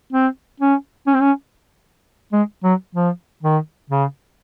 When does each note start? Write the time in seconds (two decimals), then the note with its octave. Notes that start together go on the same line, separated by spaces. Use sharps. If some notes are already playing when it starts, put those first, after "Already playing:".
0.13 C4
0.60 C#4
1.07 C#4
1.14 C4
1.21 C#4
2.33 G#3
2.64 F#3
2.95 F3
3.43 D#3
3.90 C#3